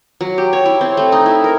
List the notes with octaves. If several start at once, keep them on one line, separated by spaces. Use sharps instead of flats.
F#3
G4
C#5
E4
C4
A3
D#4
E4
A#4